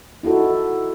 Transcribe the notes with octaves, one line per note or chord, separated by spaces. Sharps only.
D#4 E4 F#4 A4